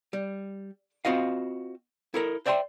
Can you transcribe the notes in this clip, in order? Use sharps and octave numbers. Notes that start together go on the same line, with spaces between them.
G3
C4 F4 F#4 D#5 F5
E4 A4 A#4
C5 D5 E5 G5 A5 C6